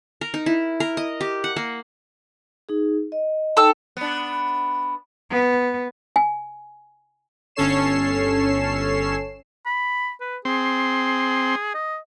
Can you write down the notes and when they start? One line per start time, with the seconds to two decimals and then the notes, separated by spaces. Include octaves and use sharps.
0.21 A#4
0.34 D#4
0.46 E4
0.80 A#4
0.97 D#5
1.21 G4
1.44 F#5
1.56 A#3
2.69 D#4 G#4
3.12 D#5
3.57 D#4 A4 G5 E6
3.97 B3 D4
5.30 B3
6.16 G#5
7.55 G1 C#4 A4 C#5 C7 E7
9.66 B5
10.21 B4
10.45 C4 G#4 C6
11.74 D#5